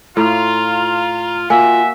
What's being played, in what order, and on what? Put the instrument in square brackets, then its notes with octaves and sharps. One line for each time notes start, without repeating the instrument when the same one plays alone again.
[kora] A2 [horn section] F4 [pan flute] A#5
[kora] A#3 [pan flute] F4 [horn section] F#4 E5 [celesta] G#5